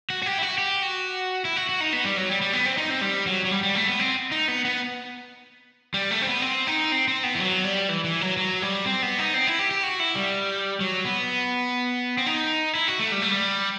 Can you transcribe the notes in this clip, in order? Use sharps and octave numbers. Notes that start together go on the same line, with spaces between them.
F#4
F#4
G4
E4
F#4
G4
F#4
E4
F#4
F#4
D#4
B3
G3
F#3
G3
G3
B3
C4
D#4
C4
G3
F#3
F#3
G3
G3
A3
B3
C4
D#4
B3
B3
G3
A3
C4
B3
C4
D#4
C4
C4
B3
E3
F#3
G3
E3
E3
F#3
F#3
G3
C4
B3
D#4
C4
E4
G4
G4
F#4
E4
G3
F#3
B3
C4
D#4
E4
F#4
A3
G3
A3
G3